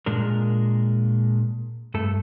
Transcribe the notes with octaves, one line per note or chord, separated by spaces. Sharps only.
A#2 G#3 D4 A#4
G2 A3 A4